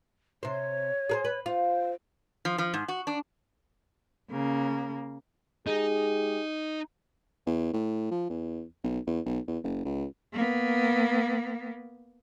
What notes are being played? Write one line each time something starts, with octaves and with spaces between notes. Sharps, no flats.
C3 C5 C#5
G#4 A#4 C5
B4
F4 C5
F3
F3
G#2
F#4
D4
C#3 A#3
G#3 D#4 G4 G#4
E2
A2
F3
E2
B1
E2
B1
E2
F#1
C#2
A#3 B3